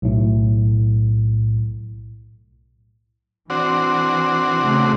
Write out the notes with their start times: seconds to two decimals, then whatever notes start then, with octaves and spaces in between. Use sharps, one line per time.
0.02 B1 A2
3.50 E3 C4 D4 F#4
4.63 C#3 A3